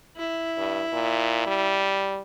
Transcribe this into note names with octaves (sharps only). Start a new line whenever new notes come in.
E4
G2
A#2
G3